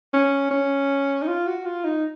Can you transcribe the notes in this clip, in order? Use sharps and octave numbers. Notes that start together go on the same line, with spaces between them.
C#4
C#4
D#4
F4
F#4
F4
D#4